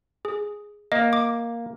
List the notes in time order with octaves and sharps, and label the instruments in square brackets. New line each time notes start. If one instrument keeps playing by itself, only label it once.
[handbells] G#4
[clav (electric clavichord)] A#3 [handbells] D#5
[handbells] D6